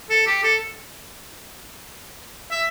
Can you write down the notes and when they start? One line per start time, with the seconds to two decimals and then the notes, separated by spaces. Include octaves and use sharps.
0.10 A4
0.27 G4
0.43 A4
2.51 E5